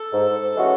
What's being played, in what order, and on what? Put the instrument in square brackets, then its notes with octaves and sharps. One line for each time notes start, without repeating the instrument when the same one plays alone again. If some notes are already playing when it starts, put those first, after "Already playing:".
Already playing: [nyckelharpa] A4
[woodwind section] G#2
E3 G#3 C#4 F#4